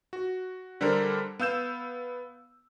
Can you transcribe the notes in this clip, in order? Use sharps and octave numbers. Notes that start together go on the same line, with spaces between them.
F#4
D3 G3 D4 A4 A#4 C5
B3 F5 E6 G6 E7